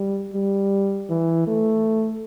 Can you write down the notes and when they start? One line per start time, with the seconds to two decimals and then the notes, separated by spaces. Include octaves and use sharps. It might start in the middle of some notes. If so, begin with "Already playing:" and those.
Already playing: G3
0.34 G3
1.09 E3
1.47 A3